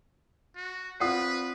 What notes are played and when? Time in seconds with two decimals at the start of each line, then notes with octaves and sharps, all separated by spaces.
0.56 F#4
1.00 C4 F4 B4 D5 F#5 D#6 C7